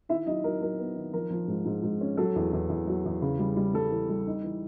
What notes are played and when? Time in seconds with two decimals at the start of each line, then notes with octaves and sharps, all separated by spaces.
0.09 D#3 E4 E5
0.26 F#3 D#4 D#5
0.44 F#3 A#4
0.61 F#3 A#4
0.79 B3
0.96 D#3
1.13 F3 A#4
1.30 F3
1.48 G#2
1.66 G#2
1.83 G#2
2.01 C#4
2.17 F#3 A4
2.36 E2
2.53 E2
2.70 E2
2.87 F#3
3.05 E2
3.22 C#3
3.39 G3
3.57 G3
3.74 G3 A4
3.92 E3
4.09 G3
4.27 D#4
4.44 E3